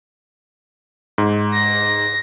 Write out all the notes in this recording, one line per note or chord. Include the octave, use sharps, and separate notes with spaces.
G#2
A#6